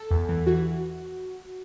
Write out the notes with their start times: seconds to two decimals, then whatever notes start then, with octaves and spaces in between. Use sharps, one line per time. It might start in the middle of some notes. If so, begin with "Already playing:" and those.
Already playing: A4
0.11 E2
0.29 E3
0.47 E3 F#4